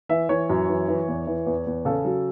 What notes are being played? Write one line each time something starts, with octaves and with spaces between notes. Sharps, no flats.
E3 E5
E3 C#5
F#2
E3
E3
E2
E3
E2
E2
C#3 A4
F#3